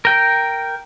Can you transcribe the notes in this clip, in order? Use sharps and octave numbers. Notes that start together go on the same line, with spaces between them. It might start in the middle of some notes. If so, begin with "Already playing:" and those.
A#4 G5